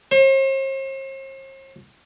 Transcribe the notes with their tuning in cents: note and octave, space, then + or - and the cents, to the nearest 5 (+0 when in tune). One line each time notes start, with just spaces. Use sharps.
C5 +45